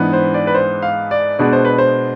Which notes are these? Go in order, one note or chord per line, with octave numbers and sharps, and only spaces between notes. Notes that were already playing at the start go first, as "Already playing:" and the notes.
Already playing: G#2 E3 B3 D4
C5
D5
B4
C5
F5
D5
B2 G#3 B3 D4 D5
C5
B4
C5